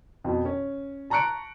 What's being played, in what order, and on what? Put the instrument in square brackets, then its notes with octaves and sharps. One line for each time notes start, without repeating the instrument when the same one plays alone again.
[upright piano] F2 B2
C#4
A5 A#5 C#6 F#6 C#7 D7